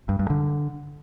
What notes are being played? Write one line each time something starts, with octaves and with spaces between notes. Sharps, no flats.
G2
G2
D3